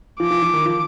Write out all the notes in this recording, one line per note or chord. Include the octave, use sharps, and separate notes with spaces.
F3 D6
F3
F3
D#3
F3